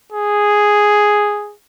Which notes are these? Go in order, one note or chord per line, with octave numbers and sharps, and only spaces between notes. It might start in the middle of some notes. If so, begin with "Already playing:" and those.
G#4